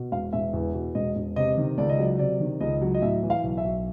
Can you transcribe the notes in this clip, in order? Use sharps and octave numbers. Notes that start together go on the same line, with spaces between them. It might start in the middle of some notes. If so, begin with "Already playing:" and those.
Already playing: B2
E1 F5
E1 E5
E2
B2
E1 D#5
E1
C3 D#5
D#3
C#2 D5
D#5
F#3 D5
C3 D5
D#3
C#2 D#5
F#3
D#5
A2 E5
E3
F5
B1
E5
B1